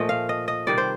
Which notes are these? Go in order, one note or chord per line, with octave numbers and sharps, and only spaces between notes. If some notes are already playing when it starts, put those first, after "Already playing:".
Already playing: A#2 F3 A3 D#5
F5
D#5
D#5
C3 D#3 G3 D5
C5